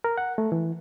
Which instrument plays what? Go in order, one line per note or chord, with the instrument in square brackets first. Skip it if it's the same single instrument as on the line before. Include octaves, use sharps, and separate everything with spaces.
[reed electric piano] A#4
F#5
A3
E3